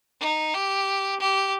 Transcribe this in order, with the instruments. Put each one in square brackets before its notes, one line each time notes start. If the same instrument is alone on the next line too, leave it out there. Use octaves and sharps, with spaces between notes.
[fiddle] D#4
G4
G4